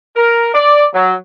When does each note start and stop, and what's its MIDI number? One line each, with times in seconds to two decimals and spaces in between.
0.16 0.50 70
0.54 0.84 74
0.93 1.13 54